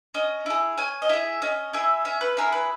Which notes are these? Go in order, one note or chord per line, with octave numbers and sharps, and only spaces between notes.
C#4 D#5
E4 G#4
C#4 G#5
D#5
E4 G#4 E5
C#4 D#5
E4 G#4 E5
C#4 E5
B4
E4 G#4 A#4
B4